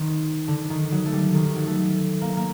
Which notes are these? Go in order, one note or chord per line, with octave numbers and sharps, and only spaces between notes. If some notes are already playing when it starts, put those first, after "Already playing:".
Already playing: D#3 C4
D3
D#3
F#3
A3
G3
D#3
D#3
F#3
A3
A#3
A#3